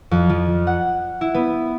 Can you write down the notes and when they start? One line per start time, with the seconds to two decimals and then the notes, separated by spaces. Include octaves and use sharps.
0.11 F2
0.29 F3
0.67 F#5
1.21 E4
1.34 B3